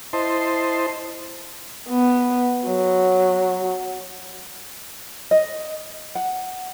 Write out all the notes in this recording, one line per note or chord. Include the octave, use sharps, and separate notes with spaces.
E4 C5 D#5 A5 C6
B3
F#3
D#5
F#5